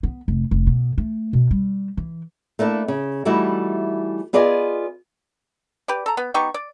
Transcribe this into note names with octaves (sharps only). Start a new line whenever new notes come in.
B3
F1
F1
B2
A3
B2
G3
E3
A3 A#3 D4 E4
C#3
E3 G3 A3 D#4 E4 F#4
B3 F4 G#4 D5 D#5 G#5
G4 B4 D5
A4 A#5
B3
B3 D#4 G4 C#6
D5